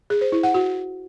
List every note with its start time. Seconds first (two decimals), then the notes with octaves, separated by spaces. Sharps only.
0.10 G#4
0.21 C5
0.32 E4
0.43 F#5
0.54 F#4